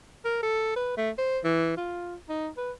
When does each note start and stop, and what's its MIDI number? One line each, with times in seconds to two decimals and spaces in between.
0.25 0.42 70
0.43 0.71 69
0.76 0.93 71
0.97 1.10 57
1.18 1.39 72
1.44 1.76 52
1.77 2.15 65
2.29 2.49 63
2.57 2.71 71